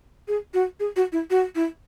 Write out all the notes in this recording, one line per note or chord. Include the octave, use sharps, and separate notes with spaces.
G#4
F#4
G#4
F#4
E4
F#4
E4